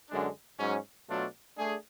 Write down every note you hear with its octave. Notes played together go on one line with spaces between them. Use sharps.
F#2 D3 G#3 D4
G#2 F#3 C#4
B2 F#3 A3 D4 F4
A3 D4 G#4